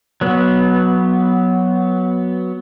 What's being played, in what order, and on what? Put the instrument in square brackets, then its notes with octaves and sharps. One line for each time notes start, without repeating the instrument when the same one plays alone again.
[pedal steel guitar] F#3 B3